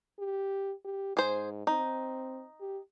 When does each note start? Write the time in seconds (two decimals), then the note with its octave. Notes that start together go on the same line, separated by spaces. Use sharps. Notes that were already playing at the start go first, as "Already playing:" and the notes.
0.19 G4
0.85 G4
1.17 G#2 G#4 C5
1.67 C4 D#4
2.61 G4